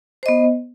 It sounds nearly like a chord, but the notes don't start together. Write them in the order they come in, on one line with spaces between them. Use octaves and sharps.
C5 D#5 B3